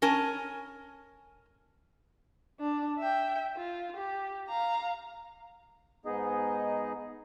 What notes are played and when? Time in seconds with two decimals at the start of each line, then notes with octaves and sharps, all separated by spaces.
0.02 C#4 A#4 G#5 A5
2.60 D4
2.98 E5 G5
3.57 F4
3.96 G4
4.48 F5 A#5
6.05 G#2 B3 D#4 G#4 D#5